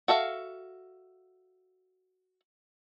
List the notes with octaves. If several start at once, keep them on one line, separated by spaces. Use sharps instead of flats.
F#4 A4 E5 F5